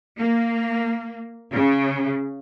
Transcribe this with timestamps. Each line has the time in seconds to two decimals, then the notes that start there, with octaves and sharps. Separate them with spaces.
0.19 A#3
1.53 C#3